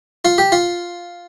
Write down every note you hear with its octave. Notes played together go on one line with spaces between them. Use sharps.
F4
G4
F4